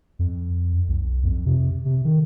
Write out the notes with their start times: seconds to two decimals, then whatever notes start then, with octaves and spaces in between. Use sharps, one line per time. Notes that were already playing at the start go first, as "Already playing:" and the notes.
0.19 F2
0.88 B1
1.23 F2
1.46 C3
1.85 C3
2.05 D#3